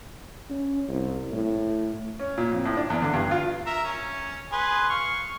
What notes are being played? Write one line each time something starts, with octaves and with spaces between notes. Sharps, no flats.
C#4
C2
A2
C#4
A#2
F2
A2
D4
E2
D3
G2
F4
A#4 E5
C#4
G#4 B4 C6
F5 C#6